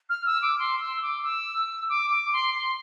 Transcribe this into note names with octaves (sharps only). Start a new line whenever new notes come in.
F6
E6
D6
C6
E6
D6
E6
D6
D6
C6
C6